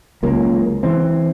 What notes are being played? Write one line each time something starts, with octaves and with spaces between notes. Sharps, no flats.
C#2 F#3 A#3
E3 C4